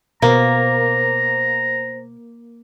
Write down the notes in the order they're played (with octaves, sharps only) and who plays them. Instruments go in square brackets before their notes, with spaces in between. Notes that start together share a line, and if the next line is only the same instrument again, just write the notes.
[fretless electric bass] B2 [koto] A#3 [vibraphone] C5 [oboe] A#5